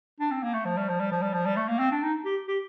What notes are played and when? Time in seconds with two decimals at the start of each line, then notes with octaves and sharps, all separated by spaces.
0.20 D4
0.31 C4
0.43 A#3
0.54 A3
0.65 F3
0.77 G3
0.89 F3
1.00 G3
1.12 F3
1.22 G3
1.34 F3
1.46 G3
1.56 A3
1.69 A#3
1.79 C4
1.91 D4
2.03 D#4
2.25 G4
2.48 G4